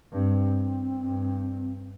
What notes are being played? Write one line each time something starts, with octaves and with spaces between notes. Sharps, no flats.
G2 C4
G2